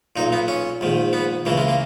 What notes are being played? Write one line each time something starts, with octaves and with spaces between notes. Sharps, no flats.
B1 A#2 D#4
B3
C#4
A#1 G#2 D#3
B3
C#2 C#3 E3 A#3
G#3
A#3